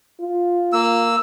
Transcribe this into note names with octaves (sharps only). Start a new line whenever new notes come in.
F4
A#3 E6